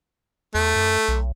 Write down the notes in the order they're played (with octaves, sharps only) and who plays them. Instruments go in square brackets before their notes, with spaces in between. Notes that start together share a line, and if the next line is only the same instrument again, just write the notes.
[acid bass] E2 [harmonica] A3
[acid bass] F#2
B1